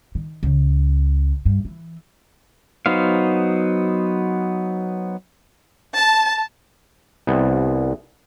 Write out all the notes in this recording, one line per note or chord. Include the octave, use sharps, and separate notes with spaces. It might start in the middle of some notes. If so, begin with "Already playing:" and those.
D#3
C#2
G2
E3
F#3 B3 D#4 C5 F5
A5
C2 B3